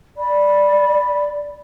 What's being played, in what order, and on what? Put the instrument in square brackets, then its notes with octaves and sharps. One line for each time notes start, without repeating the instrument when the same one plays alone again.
[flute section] D5 B5